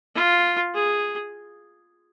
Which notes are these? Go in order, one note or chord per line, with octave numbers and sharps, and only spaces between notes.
F4
G#4